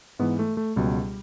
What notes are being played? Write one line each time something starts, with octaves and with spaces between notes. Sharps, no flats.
G#2 E3 B3
A3
A3
C#2 B2 F#3 G3